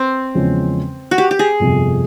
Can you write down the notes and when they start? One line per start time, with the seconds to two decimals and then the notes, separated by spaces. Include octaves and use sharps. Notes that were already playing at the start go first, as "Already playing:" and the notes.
Already playing: C4
0.35 E2 C#3 F3 G#3 C#4
1.11 F#4
1.18 G4
1.31 G4
1.39 G#4
1.60 G1 F2 C3